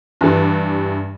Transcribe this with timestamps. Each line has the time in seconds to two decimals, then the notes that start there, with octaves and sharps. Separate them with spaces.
0.21 G2 E3 G3